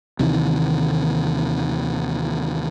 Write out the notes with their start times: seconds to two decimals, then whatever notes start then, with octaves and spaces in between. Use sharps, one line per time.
0.19 D#2 C3 D#3 E3